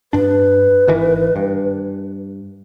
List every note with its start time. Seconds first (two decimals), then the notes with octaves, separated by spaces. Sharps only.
0.13 G2 D4 B4
0.87 G#1 D#3 E3
1.36 G2